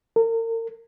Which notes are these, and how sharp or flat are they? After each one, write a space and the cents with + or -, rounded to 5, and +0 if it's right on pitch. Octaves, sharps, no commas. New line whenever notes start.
A#4 -40